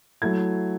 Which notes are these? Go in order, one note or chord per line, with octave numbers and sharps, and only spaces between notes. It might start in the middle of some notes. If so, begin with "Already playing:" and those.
F#3 A3 E4 G#6